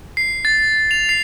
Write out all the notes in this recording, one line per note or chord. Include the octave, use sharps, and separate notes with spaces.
C7
A6
F7
C7